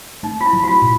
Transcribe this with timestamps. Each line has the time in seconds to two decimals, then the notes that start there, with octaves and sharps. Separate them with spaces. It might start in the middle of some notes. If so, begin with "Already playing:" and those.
0.23 A3 D#4
0.41 F4
0.46 E4
0.53 F#3
0.64 F#4
0.68 F4
0.82 A#2